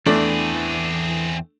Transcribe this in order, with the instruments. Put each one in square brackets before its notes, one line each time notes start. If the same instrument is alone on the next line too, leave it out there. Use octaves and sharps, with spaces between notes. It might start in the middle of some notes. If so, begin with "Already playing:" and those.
[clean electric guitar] E2 E3 [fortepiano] A3 [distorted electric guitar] C4 G#4 [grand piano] D4